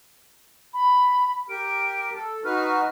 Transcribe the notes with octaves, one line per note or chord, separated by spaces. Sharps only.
B5
G4 A#4 D7
A4
D#4 F#4 B4 F6